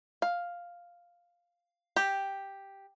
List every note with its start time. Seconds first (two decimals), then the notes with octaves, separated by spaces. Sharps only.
0.22 F5
1.96 G4